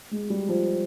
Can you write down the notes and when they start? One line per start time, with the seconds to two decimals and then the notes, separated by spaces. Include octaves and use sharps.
0.11 G#3
0.30 G3
0.49 F3